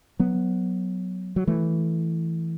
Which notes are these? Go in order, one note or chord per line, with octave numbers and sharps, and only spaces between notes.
F#3 B3
F#3
E3 A3